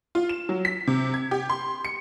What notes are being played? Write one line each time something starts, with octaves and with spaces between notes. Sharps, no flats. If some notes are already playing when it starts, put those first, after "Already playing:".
F4
E7
F#3
B6
C3
G#6
G4
C6
C#7